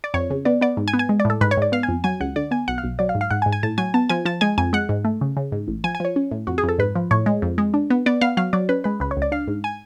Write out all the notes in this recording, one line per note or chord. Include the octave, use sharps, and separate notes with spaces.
D5
F2 C#5
C#3
B3 D5
B3 D5
G#2
G#5
B3
G#5
G#3
D5
A2 A4
G#2 B4
C#5
G#2 D5
B3 F5
G#5
F2
F#3 G#5
C#2 F#5
D3 D5
B3 G#5
B1 F#5
F5
B1
F#3 D5
F5
G#2
F5
G#2 F#5
G#5
G#2
G#5
A2 A5
F#3 G#5
B3 A5
F3 G#5
F3 A5
G#3 G#5
F2 G#5
G#3 F#5
G#2
A3
C#3
C#3
G#2
A1
F3 G#5
G#5
F3 C#5
C#4
A2
F2 F#4
G#4
F2 A4
G#2 B4
F3
A2 C#5
G#3
F2
G#3
D4
B3
B3 D5
B3 F5
F#3 F5
F#3 D5
C#4 B4
G#3 B4
C#2 B4
C#5
C#2 D5
D4 F5
G#2
G#5